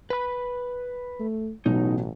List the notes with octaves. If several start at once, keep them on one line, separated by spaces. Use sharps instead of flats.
B4 B5
A3
A1 B2 F#3 D#4